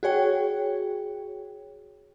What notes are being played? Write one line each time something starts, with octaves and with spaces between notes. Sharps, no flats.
F#4 G#4 C#5 G5